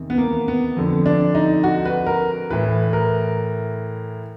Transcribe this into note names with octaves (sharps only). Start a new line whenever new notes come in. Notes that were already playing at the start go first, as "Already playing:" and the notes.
Already playing: E2 C3 D#3
B3
A#3
B3
F2 D3
D4
D#4
F#4
B4
A#4
A2 E3 B4
A#4